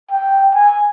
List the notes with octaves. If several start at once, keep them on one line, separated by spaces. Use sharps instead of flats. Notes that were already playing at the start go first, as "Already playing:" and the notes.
G5
G#5